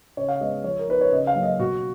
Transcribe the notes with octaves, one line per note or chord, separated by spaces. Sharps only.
C#3 C#5
F5
G#3 B3 D#5
F3 C#5
A#4
B3 D#4 B4
C#5
C#3 D#5
F5
F#3 A#3 C#4
D#5
B2 F#4